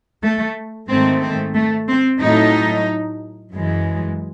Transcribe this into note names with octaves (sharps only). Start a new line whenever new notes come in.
A3
G#2 D#3 A3 C4
C4
A3
C4
A2 F#3 A3 D#4
F#2 E3 G#3